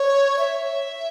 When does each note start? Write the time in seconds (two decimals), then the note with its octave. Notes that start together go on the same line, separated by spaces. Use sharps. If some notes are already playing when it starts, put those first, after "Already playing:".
Already playing: C#5
0.39 E5